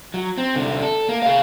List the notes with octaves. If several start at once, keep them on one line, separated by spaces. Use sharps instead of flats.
F#3
C4
C2 D3
A4
A#3
G#4 F5